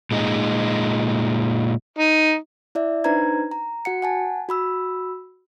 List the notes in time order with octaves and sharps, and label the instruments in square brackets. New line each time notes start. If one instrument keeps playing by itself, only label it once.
[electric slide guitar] A#2 G#3 D#4
[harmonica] D#4
[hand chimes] E4 D5 E5
D4 D#4 B4 C5 A#5 G#6
A#5
F#4 F#5 C#7
F#5 G#5 A5
F#4 B5 E6